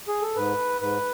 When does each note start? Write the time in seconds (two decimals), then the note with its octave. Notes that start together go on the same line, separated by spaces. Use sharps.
0.08 G#4
0.22 A4
0.36 G#2 B4
0.80 G#2 B4